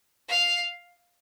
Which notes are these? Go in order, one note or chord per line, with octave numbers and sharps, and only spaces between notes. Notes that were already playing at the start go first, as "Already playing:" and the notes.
F5